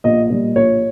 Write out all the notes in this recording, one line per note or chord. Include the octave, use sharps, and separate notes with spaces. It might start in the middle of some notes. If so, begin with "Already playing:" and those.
A#1 D#5
A#2 G3
A#1 C#5